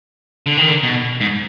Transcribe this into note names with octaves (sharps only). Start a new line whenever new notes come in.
D3
D#3
D3
B2
G#2